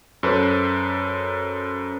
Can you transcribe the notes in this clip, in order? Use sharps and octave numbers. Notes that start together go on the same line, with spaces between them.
F#2 A4 B4 C5